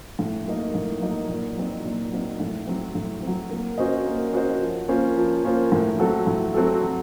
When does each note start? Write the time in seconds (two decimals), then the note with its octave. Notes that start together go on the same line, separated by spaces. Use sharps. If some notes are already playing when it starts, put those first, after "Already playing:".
0.19 A2
0.46 F#3 A#3 D#4
0.75 A2
1.02 F#3 A#3 D#4
1.29 A#2
1.57 F#3 C4 D#4
1.85 A#2
2.12 F#3 C4 D#4
2.40 A2
2.67 F#3 C4
2.95 A2
3.23 F#3 C4
3.51 A#3
3.78 C#4 F#4 C5 D#5
4.06 A#3
4.33 C#4 F#4 C5 D#5
4.61 F3
4.88 A#3 C#4 F4 C5
5.16 F3
5.44 A#3 C#4 F4 C5
5.72 A2
5.99 F#3 C4 F#4 A4
6.27 A2
6.54 F#3 C4 F#4 A4
6.82 F#3